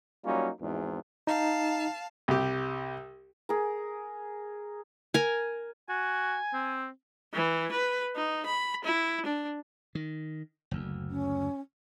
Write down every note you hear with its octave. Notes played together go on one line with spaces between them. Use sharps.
F#3 G3 A#3 C#4 D#4 F4
G#1 E2 G#2
D#4 F5 A5
C2 G4
G#4 A#4
A#4 G#5
F#4 G#5
C4
E3
B4
D#4
B5
E4
D4
D#3
F#1 D2
C#4